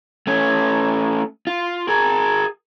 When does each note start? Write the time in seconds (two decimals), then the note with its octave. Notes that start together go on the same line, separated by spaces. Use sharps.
0.27 A3 C#4
1.47 F4
1.88 G#4 A#4